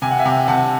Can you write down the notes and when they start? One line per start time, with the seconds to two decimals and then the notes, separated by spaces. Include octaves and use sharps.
0.02 C3 G#5
0.11 F#5
0.19 E5 G#5
0.25 C3
0.48 C3 F#5 A5